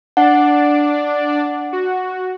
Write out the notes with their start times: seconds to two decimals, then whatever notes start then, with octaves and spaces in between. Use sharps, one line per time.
0.17 D4 D5 F#5
1.73 F#4